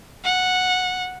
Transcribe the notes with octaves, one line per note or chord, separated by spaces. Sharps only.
F#5